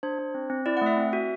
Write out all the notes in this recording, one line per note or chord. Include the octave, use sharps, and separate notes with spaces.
D4 C5
D4
C4
C4
E4 D5
F#5
A3 E5
C4
F#4